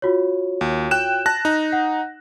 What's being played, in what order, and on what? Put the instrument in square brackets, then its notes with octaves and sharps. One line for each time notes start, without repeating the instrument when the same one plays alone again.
[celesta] F4 F#4 C#5
[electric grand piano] D#2
G5 F#6 E7
A5 F#6 A#6
D#4
[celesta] F#5